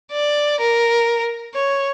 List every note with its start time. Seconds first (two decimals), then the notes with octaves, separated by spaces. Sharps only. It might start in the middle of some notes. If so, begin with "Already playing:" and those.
0.12 D5
0.60 A#4
1.54 C#5